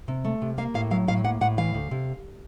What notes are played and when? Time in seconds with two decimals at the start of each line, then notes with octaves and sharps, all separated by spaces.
0.08 C3
0.25 A3
0.42 C3
0.58 A#3 F5
0.74 A2 F5
0.91 F#3 F5
1.08 A2 F5
1.24 A#3 F#5
1.41 A2 F#5
1.58 E3 F5
1.74 D2
1.91 C3